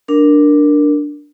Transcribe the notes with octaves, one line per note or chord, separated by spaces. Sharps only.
D4 A#4